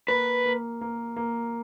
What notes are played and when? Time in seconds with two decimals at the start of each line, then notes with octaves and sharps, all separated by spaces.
0.08 A#3 B4
0.46 A#3
0.81 A#3
1.16 A#3